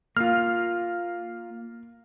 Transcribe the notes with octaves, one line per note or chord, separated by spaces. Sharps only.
A#3 F4 F6